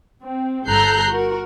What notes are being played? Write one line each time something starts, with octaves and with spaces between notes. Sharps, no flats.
C4
G1 A4 A#5 F#6 G6 C7
F#4 A#4